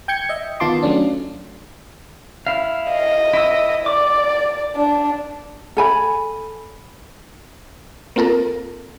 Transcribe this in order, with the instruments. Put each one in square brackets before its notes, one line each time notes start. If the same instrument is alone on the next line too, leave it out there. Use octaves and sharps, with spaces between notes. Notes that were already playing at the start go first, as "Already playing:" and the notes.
[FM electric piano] G5 G6 G#6 C#7
D#5 E5
D#3 B3 F4 A5 C6 D6
F#3 A3 C#4 D4
[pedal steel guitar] E4 F5
[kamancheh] D#5
[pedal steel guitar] E4 E6
[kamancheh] D5 [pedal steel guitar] D6
[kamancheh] D4
[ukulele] A4 G#5 B5
[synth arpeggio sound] A#3 C4 F4 A4 A#4